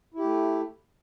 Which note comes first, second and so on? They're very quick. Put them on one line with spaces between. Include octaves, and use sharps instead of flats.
E4 G4 A3